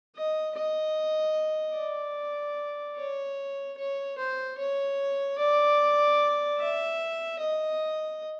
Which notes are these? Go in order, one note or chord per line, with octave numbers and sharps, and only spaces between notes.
D#5
D#5
D5
C#5
C#5
C5
C#5
D5
E5
D#5